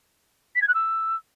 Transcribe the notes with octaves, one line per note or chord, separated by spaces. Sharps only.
B6
G#6
F#6
E6